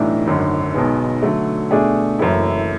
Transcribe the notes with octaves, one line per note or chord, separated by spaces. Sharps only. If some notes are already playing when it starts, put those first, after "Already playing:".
Already playing: B1 A2 E3 A3 D4
G#1 F#2 D3
B1 B2 G#3 B3
D3 F#3 A3
B2 A3 D4 G#4
F#1 F#2 E3 A3 E4